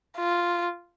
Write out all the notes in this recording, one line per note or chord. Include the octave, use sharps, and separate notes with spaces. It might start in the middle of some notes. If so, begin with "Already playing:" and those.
F4